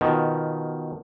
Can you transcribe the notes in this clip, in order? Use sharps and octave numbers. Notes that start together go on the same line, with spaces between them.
B2 D#3 F3